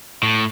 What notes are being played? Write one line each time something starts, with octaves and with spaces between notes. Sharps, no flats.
A2